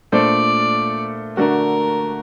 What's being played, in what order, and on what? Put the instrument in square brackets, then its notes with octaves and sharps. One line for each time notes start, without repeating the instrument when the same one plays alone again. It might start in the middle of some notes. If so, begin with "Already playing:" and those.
[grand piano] A#2 A3 D4 A4 C5 [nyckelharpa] D5
[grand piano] D3 A3 D4 F#4 [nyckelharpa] A#4